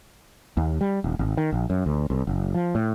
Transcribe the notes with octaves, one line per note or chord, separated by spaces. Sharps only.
D#2
G3
D#1
G#1
D#3
A#1
F#2
D2
C2
F#1
F3
A2